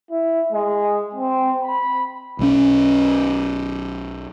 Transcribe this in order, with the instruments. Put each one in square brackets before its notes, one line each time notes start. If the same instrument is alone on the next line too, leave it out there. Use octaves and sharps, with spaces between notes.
[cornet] E4
G#3
C4
B5
[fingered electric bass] B1 G3 C#4